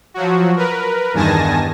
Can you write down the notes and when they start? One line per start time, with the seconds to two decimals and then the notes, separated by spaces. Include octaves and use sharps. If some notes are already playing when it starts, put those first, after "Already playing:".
0.14 F3 F#3 F#4
0.56 A#4 B4
1.14 E2 G2 D#3 G#5 A5 A#6